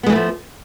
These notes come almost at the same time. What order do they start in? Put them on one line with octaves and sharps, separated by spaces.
B3 G#3 E3 A3 F3